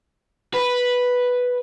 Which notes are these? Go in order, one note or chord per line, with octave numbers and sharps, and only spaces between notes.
B4